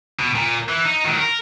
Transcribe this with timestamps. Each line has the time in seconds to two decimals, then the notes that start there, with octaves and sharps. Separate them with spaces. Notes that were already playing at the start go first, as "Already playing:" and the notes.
0.19 B2
0.36 A#2
0.69 E3
0.85 D#4
1.05 D#3 F#3
1.20 A#4